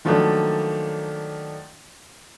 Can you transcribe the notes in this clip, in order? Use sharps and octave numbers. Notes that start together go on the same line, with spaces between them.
D#3 F3 F#3 A3 A#3 D4